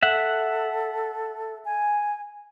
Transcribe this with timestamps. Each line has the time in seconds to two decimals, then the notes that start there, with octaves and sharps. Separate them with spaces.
0.03 A4 E5 F#5
1.65 G#5